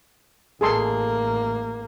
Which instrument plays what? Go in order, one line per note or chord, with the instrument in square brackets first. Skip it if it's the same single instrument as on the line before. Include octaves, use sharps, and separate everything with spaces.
[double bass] A1 A#3 [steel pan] G#4 A4 C6